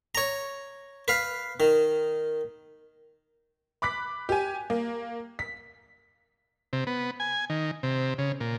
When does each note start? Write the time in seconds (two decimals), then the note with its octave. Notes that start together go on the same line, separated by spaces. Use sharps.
0.15 C#5 A#5
1.08 B4 F5
1.60 D#3
3.82 B5 D6 F#6 B6
4.29 G4 G#5
4.70 A#3
5.39 B6
6.73 C3
6.87 B3
7.20 G#5
7.50 D#3
7.83 C3
8.18 C#3
8.40 A#2